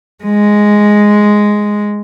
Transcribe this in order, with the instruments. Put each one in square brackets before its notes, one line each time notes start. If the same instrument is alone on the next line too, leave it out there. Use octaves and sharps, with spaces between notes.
[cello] G#3